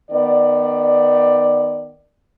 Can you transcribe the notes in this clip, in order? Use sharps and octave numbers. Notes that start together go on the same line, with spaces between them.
D#3 B3 D5